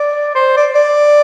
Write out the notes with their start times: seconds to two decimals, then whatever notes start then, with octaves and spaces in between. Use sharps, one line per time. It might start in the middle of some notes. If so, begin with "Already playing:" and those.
Already playing: D5
0.35 C5
0.57 D5
0.75 D5